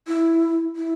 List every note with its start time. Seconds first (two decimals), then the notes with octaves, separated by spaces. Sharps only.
0.08 E4
0.76 E4